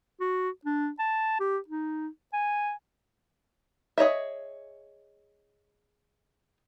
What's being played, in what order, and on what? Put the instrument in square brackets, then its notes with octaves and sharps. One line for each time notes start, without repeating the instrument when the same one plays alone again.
[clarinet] F#4
D4
A5
G4
D#4
G#5
[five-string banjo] G#4 C#5 D#5 E5